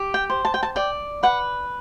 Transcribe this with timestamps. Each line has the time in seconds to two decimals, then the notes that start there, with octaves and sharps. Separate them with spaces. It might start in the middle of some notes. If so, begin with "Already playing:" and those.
Already playing: G4
0.14 G5
0.30 C5
0.45 A5
0.54 G5
0.63 A5
0.76 D5 G5
1.23 B4 F#5